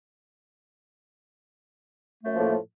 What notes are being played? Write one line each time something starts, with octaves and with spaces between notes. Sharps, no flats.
F#2 A2 F3 A3 A#3